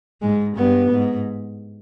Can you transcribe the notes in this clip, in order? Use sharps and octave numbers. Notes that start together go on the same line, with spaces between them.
G#2 G#3
G2 B3
G#2